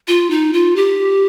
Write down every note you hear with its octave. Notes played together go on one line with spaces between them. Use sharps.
F4
D#4
F4
G4